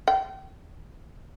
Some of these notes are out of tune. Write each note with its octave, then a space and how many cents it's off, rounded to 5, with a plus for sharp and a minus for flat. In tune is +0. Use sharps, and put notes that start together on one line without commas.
G5 -30